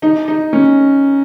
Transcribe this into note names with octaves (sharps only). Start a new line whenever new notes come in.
D#4
D#4
C#4